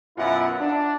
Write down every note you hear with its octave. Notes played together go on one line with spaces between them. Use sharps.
F#2 B2 E4 F4 A#4 F#5
D4